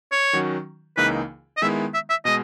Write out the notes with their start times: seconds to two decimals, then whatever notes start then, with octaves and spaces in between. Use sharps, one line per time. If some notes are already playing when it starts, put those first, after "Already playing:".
0.12 C#5
0.33 D#3 F#3 C#4 F#4
0.97 C#2 C#3 E3 A#3 D#4 B4
1.57 D#5
1.62 D#3 G#3 B3 E4 E5
1.94 E5
2.10 E5
2.25 B2 G#3 D#5